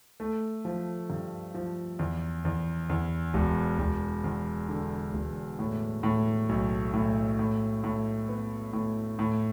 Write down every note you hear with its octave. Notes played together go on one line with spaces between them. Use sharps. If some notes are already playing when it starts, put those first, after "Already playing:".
A3
F3
G2
F3
E2
E2
E2
E1
E1
E2
D3
E1
A2
A2
B1
A2
A2
A2
B3
A2
A2